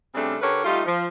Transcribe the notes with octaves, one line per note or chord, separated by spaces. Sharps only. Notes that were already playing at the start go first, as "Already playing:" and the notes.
C#3 G3 A3 C4 D4
D3 G4 A#4 B4 C#5
G3 A3 D#4 F4
F3